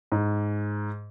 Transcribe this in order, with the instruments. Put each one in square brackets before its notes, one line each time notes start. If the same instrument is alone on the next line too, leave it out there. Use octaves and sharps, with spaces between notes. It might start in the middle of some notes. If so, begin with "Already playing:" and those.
[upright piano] G#2